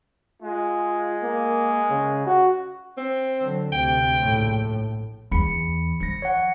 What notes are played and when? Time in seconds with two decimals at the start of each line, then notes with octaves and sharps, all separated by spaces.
0.42 G#3 F4
1.23 A#3
1.90 C#3
2.27 F#4
2.97 C4
3.38 D3 F#3
3.72 D2 C3 G5
4.20 A#1 A2
5.32 E2 B5 C#7
6.00 F3 A#6 C#7
6.22 C#5 F#5